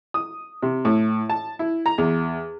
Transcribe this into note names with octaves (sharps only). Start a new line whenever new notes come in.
D#6
C3
A2
A5
E4
A#5
E2